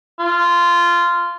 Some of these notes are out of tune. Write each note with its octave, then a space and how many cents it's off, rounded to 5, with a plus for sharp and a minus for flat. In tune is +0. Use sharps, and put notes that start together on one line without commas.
F4 -15